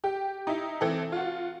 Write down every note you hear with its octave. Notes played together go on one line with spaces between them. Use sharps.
G4
D#4 E4
E3 C4 A4
F4 F#4